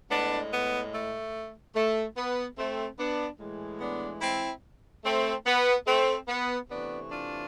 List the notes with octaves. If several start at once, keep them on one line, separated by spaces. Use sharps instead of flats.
A2 G#3 B3 D4
B3
A3
A3
B3
A3 C4
B3 D4
A2 E3 G#3
B3 D4
C4 E4
A3 C4
B3
A3 C4
B3
C3 E3 A3 B3 D4
D4 F4